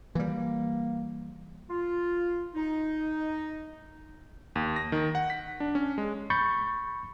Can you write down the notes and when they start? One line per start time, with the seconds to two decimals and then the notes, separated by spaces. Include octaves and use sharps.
0.15 E3 G3 A#3
1.70 F4
2.55 D#4
4.55 D#2
4.76 A#6
4.92 D#3
5.15 F#5
5.30 B6
5.60 D4
5.75 C#4
5.98 G#3
6.30 B5 C#6 G6 A6 C#7